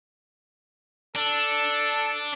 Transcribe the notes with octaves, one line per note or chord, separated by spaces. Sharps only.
D4 A4